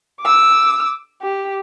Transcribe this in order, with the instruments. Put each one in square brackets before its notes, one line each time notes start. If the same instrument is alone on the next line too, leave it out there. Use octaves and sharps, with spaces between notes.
[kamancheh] D6 E6
G4